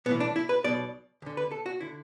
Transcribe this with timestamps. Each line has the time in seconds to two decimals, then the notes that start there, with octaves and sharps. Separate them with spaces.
0.06 B1 A2 E3 B3
0.20 D4
0.36 E4
0.49 B4
0.64 B1 B2 D5
1.22 D2 D3
1.37 B4
1.51 A4
1.66 F#4
1.81 D3 E4